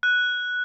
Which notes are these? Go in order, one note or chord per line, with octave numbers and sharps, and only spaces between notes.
F#6